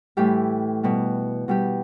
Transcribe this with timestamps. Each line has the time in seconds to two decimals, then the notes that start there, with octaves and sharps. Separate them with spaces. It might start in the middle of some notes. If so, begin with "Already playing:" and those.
0.17 A2 E3 G3 G4
0.83 B2 G3
1.48 B2 G3 G4